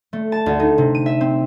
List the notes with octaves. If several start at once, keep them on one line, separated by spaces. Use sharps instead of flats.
A3
A5
D2
D#4
C3
D#7
E5
C4